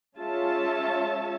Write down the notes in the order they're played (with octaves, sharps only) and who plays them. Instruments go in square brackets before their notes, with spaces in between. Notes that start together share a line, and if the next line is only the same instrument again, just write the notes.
[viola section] G#3 C#4 F4 C#5 E5 A5